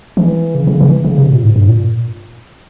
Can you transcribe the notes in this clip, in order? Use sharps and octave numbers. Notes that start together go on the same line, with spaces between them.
E3
C#3
C#3
E3
C#3
C3
A#2
G#2
G2
A#2